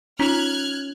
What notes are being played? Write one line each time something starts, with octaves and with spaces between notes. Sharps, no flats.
C#4 D#4 F4 A#5 F6 F#6 G#6